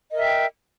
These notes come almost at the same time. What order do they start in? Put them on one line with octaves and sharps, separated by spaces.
D#5 A#4 E5 G5